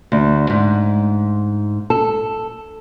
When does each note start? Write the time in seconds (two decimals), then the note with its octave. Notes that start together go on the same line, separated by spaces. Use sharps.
0.12 D2
0.50 G#2
1.90 A4